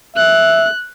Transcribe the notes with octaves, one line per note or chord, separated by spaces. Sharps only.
E5 F#6